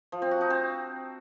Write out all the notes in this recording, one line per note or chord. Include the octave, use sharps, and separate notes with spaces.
F3
C4
F#4
D#4
C4